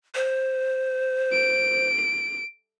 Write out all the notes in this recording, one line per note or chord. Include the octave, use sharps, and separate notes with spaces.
C5
D7